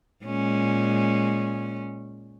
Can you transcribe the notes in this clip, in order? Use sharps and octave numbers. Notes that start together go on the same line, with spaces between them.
A#2 G#3 C#4